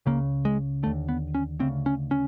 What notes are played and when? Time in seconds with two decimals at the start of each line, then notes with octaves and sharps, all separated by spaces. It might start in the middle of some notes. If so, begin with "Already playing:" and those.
0.06 C#2 C#3 A#3
0.45 G#3
0.83 D#2 D3 A3
1.09 B3
1.35 C#4
1.60 D2 C#3 C4
1.86 C#4
2.11 C#4